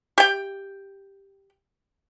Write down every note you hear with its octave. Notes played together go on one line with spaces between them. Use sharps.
G4 G5